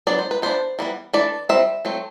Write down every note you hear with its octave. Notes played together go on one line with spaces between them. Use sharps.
F#3 B3 D4 D5
C5
B4
E3 B3 D4 C5
E3 G3 B3
E3 A3 D4 D5
G3 C4 E5
F#3 A3 C4